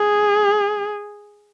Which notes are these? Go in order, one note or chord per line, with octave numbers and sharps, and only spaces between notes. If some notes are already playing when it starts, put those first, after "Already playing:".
Already playing: G#4